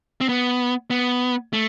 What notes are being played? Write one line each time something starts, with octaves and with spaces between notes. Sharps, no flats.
C4
B3
B3
A3